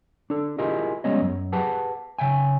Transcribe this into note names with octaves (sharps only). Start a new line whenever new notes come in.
D4 A4
E4 F4 G4 G#4 A#4 D#5
G3 G#3 B3 C#4 C#5 D#5
F#2
G4 G#4 B4 F#5 A5
C#3 E5 G5 G#5